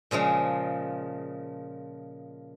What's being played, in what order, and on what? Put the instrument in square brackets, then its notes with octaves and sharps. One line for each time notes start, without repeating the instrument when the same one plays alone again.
[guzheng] A#2 C#3 F3 G#3